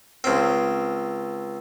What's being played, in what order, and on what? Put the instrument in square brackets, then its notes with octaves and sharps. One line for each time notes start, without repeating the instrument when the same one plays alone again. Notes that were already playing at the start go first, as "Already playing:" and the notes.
[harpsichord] C#2 C4